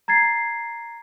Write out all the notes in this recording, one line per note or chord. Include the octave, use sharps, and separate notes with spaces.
A#5 G#6 A6 C7